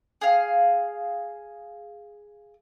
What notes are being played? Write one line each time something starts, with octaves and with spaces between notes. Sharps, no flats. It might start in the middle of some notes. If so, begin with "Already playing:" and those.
G#4 F5